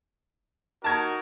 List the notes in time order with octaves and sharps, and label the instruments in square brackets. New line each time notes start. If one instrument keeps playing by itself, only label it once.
[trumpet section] D#4 F#4 A#4 [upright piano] A5 G#6